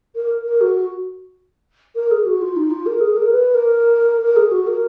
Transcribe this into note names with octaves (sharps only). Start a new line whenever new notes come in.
A#4
A#4
F#4
A#4
G#4
F#4
F4
D#4
F4
A#4
G#4
A#4
B4
A#4
A#4
G#4
F#4
A#4